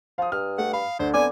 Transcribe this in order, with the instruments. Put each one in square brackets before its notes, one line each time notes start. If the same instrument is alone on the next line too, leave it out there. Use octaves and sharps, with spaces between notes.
[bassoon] F3 [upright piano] F5 D#6
[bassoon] G2 [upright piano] F6
[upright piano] A3 [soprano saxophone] F#5
[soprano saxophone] F5 [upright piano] B5
[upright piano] D2 [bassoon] D3 [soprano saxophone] C5
[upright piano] B3 C4 [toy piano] D5 D6 [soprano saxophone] G#5